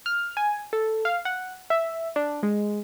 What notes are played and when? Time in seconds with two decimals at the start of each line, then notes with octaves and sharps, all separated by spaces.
0.06 F6
0.37 G#5
0.73 A4
1.05 F5
1.25 F#5
1.70 E5
2.16 D4
2.43 G#3